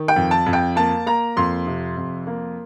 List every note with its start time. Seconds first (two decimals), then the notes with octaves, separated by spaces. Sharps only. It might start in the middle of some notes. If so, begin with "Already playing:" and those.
Already playing: D#3
0.08 G5
0.16 F2
0.31 A5
0.46 F2
0.53 G5
0.76 A#3 A5
1.06 A#3 A#5
1.37 F2 C6
1.67 C3
1.97 F2
2.27 A#3